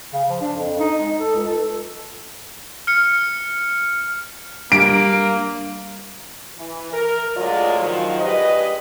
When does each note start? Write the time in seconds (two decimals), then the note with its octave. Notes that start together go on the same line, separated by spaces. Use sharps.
0.14 C#3
0.30 F3
0.41 D4
0.57 F2
0.80 D#4
1.00 G#3
1.17 A4
1.35 C#2
1.47 A4
2.87 F6 C#7
4.72 G3 A#3 D4 D7
6.57 E3
6.93 A#4
7.36 A2 D3 F#3 G#3 F4 D5
7.80 D#3 F3 F#3
8.21 G2 G#3 G4 B4 D#5